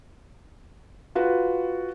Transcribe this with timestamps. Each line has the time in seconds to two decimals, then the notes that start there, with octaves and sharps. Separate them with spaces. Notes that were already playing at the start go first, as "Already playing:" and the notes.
1.15 F4 F#4 B4